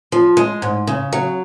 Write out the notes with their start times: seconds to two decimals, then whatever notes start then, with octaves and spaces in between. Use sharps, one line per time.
0.12 F3
0.37 G#3
0.62 G#2
0.87 C#3
1.13 F#3